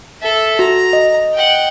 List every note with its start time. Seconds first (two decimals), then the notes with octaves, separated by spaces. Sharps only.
0.21 A4 E5
0.59 F#4 A#5
0.93 D#5
1.34 F#5 G5